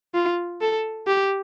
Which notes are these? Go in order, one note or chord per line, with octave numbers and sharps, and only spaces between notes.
F4
A4
G4